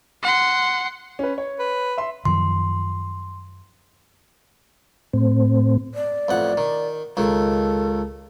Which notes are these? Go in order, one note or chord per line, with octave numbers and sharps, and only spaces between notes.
F#5 C6
C#4 B4
C#5
B4
E5 C6
F#2 D#3 F3 C6
A2 C4
D5
A1 F2 F#5
D#3
C#2 D#3 A4